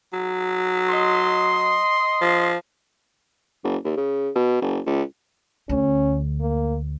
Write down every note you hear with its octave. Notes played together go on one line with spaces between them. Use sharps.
F#3
D#5 C6
F3
F#1
D#2
C#3
B2
F#1
C#2
D2 C#4
A#3